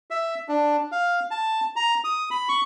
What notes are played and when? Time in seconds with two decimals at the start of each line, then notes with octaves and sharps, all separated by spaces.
0.10 E5
0.49 D4
0.92 F5
1.31 A5
1.76 A#5
2.04 D#6
2.31 B5
2.49 C#6